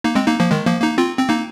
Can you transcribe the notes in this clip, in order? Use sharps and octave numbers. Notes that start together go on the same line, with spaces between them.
A#3 D#4
G#3 C4
A#3 D#4
F3 A#3
D#3 G#3
F3 A#3
A#3 D#4
C4 F4
C4
A#3 D#4